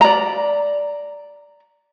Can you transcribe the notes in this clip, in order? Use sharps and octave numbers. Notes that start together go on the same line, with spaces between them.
D5 A#5